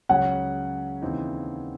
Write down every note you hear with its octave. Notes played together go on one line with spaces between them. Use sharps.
C#2 C#3 F#3 C#4 F#5
D#2 C#3 E3 C4 D#4